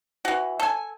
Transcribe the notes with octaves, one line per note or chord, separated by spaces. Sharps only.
E3 F#4
A4 G#5